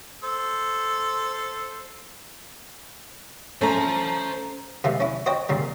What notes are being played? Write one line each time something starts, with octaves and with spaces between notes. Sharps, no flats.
A4 C5
A3 C#4 C5 A5 A#5
C3 F3 G#3 A3
C#4 E4
F#4 C5 C#5 D#5 G5 A#5
F#2 A#2 C#3 G3